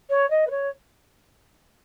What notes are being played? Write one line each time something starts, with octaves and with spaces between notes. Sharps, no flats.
C#5
D#5
B4
C#5